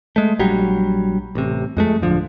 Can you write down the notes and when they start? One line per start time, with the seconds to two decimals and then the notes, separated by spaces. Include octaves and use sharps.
0.16 G#3 A3
0.39 A#1 F#3 G3
1.35 A1 C3
1.77 F2 G#3 A3
2.02 D1 D3 F3